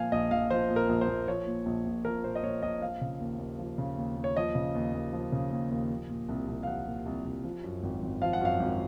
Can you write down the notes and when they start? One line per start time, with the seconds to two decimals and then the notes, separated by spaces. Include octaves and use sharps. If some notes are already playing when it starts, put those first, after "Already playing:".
Already playing: A#2 F3 F5 G#5
0.12 A#1 D#5
0.31 A#1 F5
0.50 F3 C5
0.70 A#2
0.76 A#4
0.89 A#1
1.01 C5
1.08 A#1
1.28 F3 C#5
1.47 A#2
1.66 A#1
1.85 A#1
2.05 F3 A#4
2.24 A#2 C5
2.35 D#5
2.43 A#1 C#5
2.62 A#1 D#5
2.82 F3 F5
3.01 C#3
3.20 D#2
3.39 D#2
3.59 F3
3.78 C#3
3.97 D#2
4.17 D#2
4.24 C#5
4.36 F3 D#5
4.55 C#3
4.75 D#2
4.94 D#2
5.13 F3
5.32 C#3
5.51 D#2
5.71 D#2
5.90 F3
6.09 A#2
6.29 C2
6.48 C2
6.63 F5
6.67 F3 F#5
6.87 A#2
7.06 C2
7.25 C2
7.44 F3
7.64 F#2
7.83 G#1
8.02 G#1
8.22 F3 F5
8.33 F#5
8.41 F#2 F5
8.60 G#1